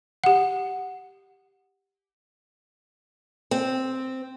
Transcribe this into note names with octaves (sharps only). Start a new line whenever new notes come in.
G4 F#5
C4